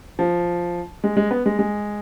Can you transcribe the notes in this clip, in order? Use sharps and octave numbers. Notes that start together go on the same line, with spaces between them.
F3
G#3
G#3
B3
G#3
G#3